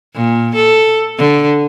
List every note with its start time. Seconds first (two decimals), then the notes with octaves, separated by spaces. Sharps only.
0.15 A#2
0.55 A4
1.18 D3